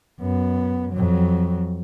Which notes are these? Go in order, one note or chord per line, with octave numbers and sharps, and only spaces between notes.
F#2 B3
F2 F#3